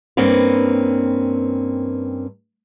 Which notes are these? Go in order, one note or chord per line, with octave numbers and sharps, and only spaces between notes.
G2 A#3 C4 C#4 B4